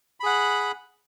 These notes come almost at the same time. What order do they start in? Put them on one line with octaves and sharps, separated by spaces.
B5 G#4 F#5